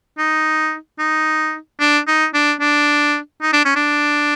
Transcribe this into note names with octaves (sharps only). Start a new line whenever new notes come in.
D#4
D#4
D4
D#4
D4
D4
D#4
D4
C#4
D4